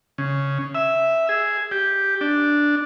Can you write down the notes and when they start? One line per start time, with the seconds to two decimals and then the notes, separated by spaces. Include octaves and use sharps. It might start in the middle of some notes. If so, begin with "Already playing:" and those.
0.18 C#3
0.75 E5
1.29 G#4
1.71 G4
2.21 D4